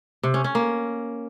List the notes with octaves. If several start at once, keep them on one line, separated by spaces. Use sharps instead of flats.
C3
C#4
C#4
A#3